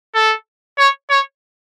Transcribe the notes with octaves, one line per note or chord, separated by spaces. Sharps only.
A4
C#5
C#5